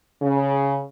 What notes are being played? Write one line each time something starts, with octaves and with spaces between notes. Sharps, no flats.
C#3